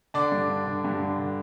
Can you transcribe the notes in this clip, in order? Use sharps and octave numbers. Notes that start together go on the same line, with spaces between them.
D3 D4 D5
G2
D3
D3
G2
D3
D3